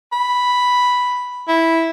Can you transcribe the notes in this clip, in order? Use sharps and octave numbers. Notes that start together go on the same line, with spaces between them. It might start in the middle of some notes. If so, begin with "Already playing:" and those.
B5
E4